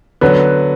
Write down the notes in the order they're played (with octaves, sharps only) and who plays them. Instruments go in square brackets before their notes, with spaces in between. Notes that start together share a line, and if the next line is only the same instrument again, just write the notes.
[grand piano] D3 F#3 [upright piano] B3